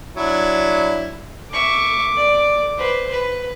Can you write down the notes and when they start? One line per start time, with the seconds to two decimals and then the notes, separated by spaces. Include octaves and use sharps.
0.17 F#3 D4 E4
1.53 E5 C#6 D6
2.16 D5
2.78 B4 C5
3.11 B4